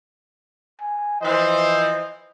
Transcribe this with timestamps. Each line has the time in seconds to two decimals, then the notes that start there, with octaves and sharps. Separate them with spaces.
0.80 G#5
1.21 E3 F3 C5 D#5